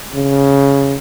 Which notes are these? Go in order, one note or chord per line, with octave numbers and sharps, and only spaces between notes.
C#3